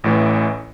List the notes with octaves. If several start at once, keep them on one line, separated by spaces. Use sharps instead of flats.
A1 A2 E3